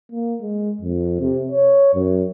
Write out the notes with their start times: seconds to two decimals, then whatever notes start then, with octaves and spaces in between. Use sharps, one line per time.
0.12 A#3
0.41 G#3
0.81 F2
1.21 C3
1.51 C#5
1.95 F#2